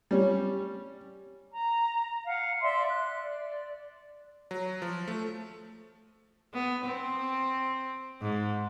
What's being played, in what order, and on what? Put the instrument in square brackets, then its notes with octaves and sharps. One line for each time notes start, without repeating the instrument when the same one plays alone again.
[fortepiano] G3 C#4
[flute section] A#5
F5 F#5
D5 E5 C6
F#6
D5
[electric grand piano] F#3
F3
A3
[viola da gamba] B3
C4
G#2